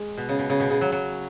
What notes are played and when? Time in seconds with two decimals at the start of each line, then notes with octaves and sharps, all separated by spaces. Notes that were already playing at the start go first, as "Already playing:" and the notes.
Already playing: G#3
0.18 B2
0.29 C#3
0.39 B2
0.50 C#3
0.60 B2
0.70 C#3
0.81 F#3
0.92 F#3